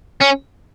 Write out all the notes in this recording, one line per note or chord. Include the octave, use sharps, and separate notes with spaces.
C#4